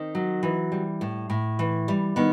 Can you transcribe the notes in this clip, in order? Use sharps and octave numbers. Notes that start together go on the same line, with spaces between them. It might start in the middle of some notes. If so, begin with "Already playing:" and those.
Already playing: D#3 C4
F#3
E3
G3
A2
A2
E3
G3
D#3 B3